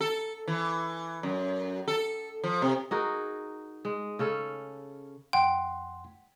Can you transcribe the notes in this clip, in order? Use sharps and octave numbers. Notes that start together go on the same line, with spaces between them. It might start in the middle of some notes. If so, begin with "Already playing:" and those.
A4
E3
F#2
A4
F3
C3
D#4 F#4 G#4 A#4
G#3
C#3 C#4 A4
F2 F#5 G5 C6